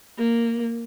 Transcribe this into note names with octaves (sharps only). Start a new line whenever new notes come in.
A#3